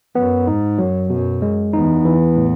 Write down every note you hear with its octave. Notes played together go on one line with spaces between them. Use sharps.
F#2 B3
G#2 D#4
F#2 F#3
F#2 B2
G#3
E2 D#4
E3
A2